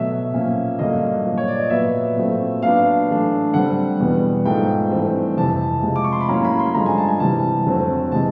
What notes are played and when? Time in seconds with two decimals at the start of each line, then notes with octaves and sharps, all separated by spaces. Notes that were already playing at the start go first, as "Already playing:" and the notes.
Already playing: B2 F#3 A3 E5
0.33 A#2 F3 A#3 C#4
0.79 G2 D3 F#3 A#3 D#5
1.25 A#2 F3 A#3
1.38 C#5
1.48 D5
1.59 D#5
1.70 A#2 F#3 B3 E5
2.17 A#2 F#3 A3 C4
2.62 A#2 F#3 B3 D4 F5
3.08 A2 E3 A3 D4
3.54 D3 G3 C4 F#5
3.99 E2 B2 G3 B3
4.45 G#2 F3 A3 G5
4.91 G2 E3 A3 C4
5.37 F2 C3 E3 A5
5.83 C3 F3 G#3
5.96 D6
6.04 C#6
6.12 C6
6.21 B5
6.29 A2 F#3 A#3 C#4 A#5
6.45 B5
6.59 C6
6.74 G2 D3 F3 G#3 A#5
6.86 G#5
6.98 A5
7.09 G#5
7.20 C3 E3 G3 A5
7.66 F2 D3 F#3 A3 C4
8.12 C3 E3 G#3 A5